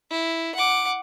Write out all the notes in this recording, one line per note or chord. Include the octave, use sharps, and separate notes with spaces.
E4
F#5 D6